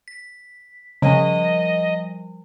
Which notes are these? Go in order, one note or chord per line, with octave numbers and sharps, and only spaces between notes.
B6
C#3 F3 G3 D#5